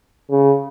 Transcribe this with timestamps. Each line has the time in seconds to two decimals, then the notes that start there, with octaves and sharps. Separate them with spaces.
0.31 C#3